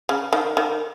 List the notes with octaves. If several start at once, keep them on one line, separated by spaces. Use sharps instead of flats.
C#3
D#3
D#3